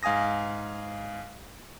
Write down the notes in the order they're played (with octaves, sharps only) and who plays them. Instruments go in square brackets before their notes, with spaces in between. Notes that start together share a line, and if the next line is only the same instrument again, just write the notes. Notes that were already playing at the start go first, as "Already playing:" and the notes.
[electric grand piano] G#2 F5 G#5 D#6 A#6